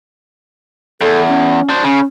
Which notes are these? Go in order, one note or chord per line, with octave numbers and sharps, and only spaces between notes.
E2 A4
C#4
D4 C5
C#3 C#4